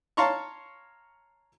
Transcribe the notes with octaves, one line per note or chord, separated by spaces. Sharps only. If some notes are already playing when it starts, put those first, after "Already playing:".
C#5 F5 A5 A#5 C6 C#6